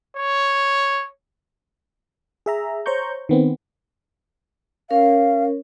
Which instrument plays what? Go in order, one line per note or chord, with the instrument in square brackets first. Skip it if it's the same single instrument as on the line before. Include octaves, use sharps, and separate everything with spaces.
[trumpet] C#5
[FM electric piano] G#4 E5 A#5
C5 C#5 A#5 C#6 G6
D#3 B3 C4
[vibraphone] C#4 A#4 C#5 [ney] F5